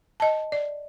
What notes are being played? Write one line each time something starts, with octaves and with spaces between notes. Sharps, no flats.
D#5 A5
D5